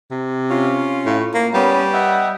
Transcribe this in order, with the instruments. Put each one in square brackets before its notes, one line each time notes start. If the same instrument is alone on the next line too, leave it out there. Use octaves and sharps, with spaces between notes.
[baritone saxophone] C3
[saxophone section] C#4 F4
[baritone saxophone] A2
A#3
[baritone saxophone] G3 [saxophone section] B3 C#4
[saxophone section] D#5 E5 F#5